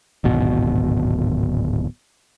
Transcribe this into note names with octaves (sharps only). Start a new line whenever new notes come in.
D1 G#1 B2